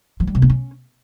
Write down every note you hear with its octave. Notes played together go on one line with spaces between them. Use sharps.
F3
G3
C3
B3
C#4